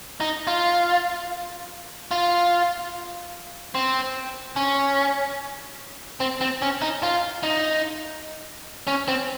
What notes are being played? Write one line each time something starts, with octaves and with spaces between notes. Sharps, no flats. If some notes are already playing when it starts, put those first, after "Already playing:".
D#4
F4
F4
C4
C#4
C4
C4
C#4
D#4
F4
D#4
C#4
C4